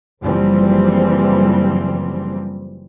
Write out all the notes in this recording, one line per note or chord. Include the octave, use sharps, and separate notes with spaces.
F#1 E3 F3 G3 C4